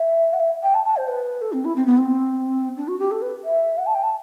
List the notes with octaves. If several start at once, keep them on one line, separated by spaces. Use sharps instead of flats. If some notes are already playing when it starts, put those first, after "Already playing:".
Already playing: E5
F#5
E5
G5
A5
A5
C5
B4
A4
C4
E4
C4
B3
C4
D4
F#4
G4
A4
B4
E5
F#5
A5
G5
A5